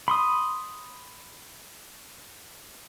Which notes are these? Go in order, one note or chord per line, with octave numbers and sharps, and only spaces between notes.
B5 C6 D#6